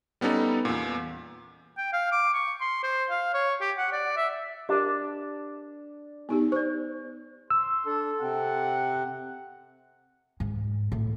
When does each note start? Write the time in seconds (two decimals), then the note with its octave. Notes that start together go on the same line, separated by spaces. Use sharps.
0.21 G3 B3 C#4 D#4 A4
0.65 E2 A#2
1.78 G5
1.93 F5
2.12 D6
2.33 C#6
2.60 C6
2.83 C5
3.10 F5
3.34 C#5
3.61 G4
3.78 F#5
3.92 D5
4.17 E5
4.69 D4 G4 A#4
6.29 B3 D#4 G4
6.52 C5 D5 C#6
7.50 C6 E6
7.86 D4 A4
8.21 C3 C4 F#5
10.40 G#2
10.92 A2